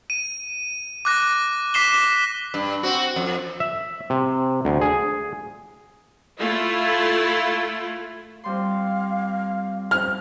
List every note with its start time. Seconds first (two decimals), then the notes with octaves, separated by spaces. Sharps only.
0.10 D#7
1.05 D6 F#6 A#6
1.74 D6 B6 C7 E7 G7
2.54 G2
2.83 C4 F#4
3.16 F2
3.60 E5
4.10 C3
4.65 D2
4.81 G#4
6.40 A3 E4 F4
8.44 F2 G3 F5 C6
9.91 F6